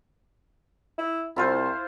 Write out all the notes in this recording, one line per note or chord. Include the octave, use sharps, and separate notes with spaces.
E4
C2 E4 F4 C5